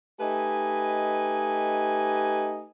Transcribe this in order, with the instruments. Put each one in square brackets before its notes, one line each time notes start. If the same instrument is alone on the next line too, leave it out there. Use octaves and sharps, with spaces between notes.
[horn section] A3 D#4 G4 B4 D#5 G#5